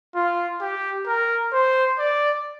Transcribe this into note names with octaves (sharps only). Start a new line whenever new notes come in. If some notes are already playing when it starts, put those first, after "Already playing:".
F4
G4
A#4
C5
D5